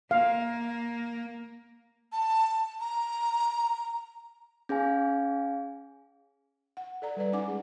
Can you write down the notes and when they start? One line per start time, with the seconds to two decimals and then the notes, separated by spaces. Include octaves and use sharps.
0.11 A#3 F5
2.12 A5
2.80 A#5
4.69 C#4 G#4 F5 G#5
6.77 F#5
7.02 A4 D5 A#5
7.17 G3 B4 D5
7.33 C#4 D#4 F#5 G#5 D6
7.48 G#3 G#4